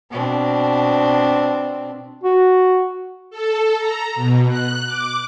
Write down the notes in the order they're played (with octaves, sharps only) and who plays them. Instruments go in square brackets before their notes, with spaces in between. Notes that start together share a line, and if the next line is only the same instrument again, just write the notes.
[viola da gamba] B2 C4 D4
[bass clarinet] F#4
[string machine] A4
A#5
B2
F#6
D6